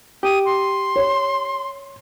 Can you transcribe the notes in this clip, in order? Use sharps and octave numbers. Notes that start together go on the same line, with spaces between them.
G4 D#6
C6
C#5